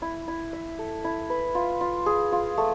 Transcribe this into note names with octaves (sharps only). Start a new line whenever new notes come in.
E4
E4
E5
A4
E4
B4
F4
F4
G#4
F4
A3